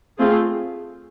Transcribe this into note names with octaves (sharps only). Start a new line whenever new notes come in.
A3 C4 F4 G#4